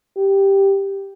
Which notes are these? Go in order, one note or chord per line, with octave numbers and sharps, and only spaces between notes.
G4